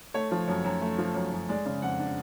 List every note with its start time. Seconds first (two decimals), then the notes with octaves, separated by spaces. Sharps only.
0.14 A3 C#5
0.31 F3
0.48 F#2
0.64 F#2
0.82 A3
0.98 F3
1.15 F#2
1.32 F#2
1.49 G#3 D5
1.65 C#3
1.82 F2 F#5
1.99 D4